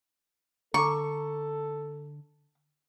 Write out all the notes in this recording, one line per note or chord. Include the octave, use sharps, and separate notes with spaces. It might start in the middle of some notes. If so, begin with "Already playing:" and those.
D3 A4 A#5 C#6 D6